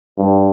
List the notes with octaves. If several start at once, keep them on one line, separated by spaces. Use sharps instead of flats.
G2